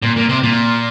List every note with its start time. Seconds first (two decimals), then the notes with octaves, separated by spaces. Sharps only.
0.02 A#2
0.16 A#2
0.29 C3
0.43 A#2